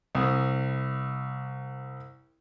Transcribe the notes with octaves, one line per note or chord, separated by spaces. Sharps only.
C2 D#6